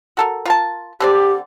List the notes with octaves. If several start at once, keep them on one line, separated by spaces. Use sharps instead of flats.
F#4 A4 A#4
F4 A#4 A5
D3 C4 G4 D5